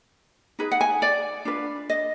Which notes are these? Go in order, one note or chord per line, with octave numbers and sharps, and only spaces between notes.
D#4 G#4 B4
F#5
G#5
D5
D4 F4 B4
D#5